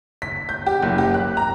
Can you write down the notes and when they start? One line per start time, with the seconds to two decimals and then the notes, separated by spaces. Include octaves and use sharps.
0.22 B6
0.49 G6
0.66 G4
0.82 F#1
0.98 G4
1.14 F#6
1.37 A#5